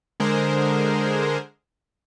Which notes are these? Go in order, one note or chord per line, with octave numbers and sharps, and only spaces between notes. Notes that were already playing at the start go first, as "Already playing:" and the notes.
D3 G#3 G#4 A#4 C5